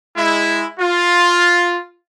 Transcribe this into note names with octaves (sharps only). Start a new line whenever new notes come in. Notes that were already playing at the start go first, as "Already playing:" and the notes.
G#3 E4
F4